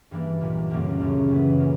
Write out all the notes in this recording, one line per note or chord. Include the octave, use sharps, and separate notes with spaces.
G2 E3 G3 A#3 D4
B1 A#2 G3
F#1 F#2 D3 G3 A#3
D2 C#3 F#3 C#4
F#2 E3 B3
A#2 A#3 C#4